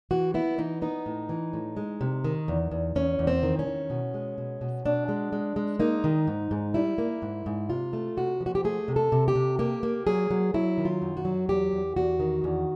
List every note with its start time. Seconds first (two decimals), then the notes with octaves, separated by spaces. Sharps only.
0.11 E3 F#4
0.34 B3 E4
0.58 E3 D#4
0.82 B3 D#4
1.06 A2
1.29 E3
1.53 A2
1.77 G#3
2.01 C3
2.24 D#3
2.48 E2
2.71 E2
2.96 E2 C#4
3.19 E2
3.27 C4
3.43 D#3
3.59 C#4
3.67 D#3
3.90 B2
4.14 G#3
4.38 B2
4.61 B2
4.86 B2 D4
5.09 G#3
5.32 G#3
5.56 G#3
5.79 A#3 D#4
6.04 D#3
6.27 G#2
6.51 G#2
6.74 G3 E4
6.98 A#3
7.22 G#2
7.46 G#2
7.70 C3 F4
7.93 A3
8.17 C3 F#4
8.41 F3
8.46 F#4
8.55 G4
8.64 A3 G#4
8.88 C3
8.96 A4
9.12 C3
9.28 G4
9.35 C3
9.59 A#3 G4
9.83 A#3
10.07 F#3 G#4
10.31 F#3
10.54 F#3 E4
10.78 D#3
10.85 F4
11.02 F#2
11.17 F#4
11.25 F#3
11.49 E2 G4
11.72 E2
11.96 E2 F#4
12.20 D#3
12.44 E2